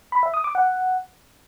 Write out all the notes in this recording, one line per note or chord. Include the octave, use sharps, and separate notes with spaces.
B5
E5
D#6
D6
F#5